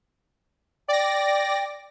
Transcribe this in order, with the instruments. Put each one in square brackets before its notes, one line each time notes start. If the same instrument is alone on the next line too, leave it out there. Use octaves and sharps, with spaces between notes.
[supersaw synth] D5 A#6 [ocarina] G5